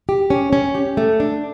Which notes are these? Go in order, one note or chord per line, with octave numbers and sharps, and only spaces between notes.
G4
C#4
C#4
G4
A3
D4